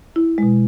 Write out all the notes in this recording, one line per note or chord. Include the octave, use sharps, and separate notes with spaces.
E4
B2 G#3